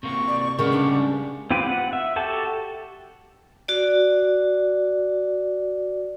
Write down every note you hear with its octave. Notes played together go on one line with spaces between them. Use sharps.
C3 A#3 C#6
D5
C#3 G3 G#3 B3 A#4
D4
C4 F4 G4 B4
F#5
E5
F#4 G4 A4 A5
F#4 D5